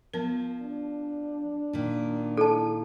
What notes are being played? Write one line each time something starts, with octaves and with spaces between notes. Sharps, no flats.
F3 B3 A#4
D4
A#2 D#3
E4 A4 A5